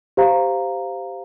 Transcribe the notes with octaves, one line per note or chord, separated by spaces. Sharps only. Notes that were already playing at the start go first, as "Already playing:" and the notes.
G4 C5 F5 A#5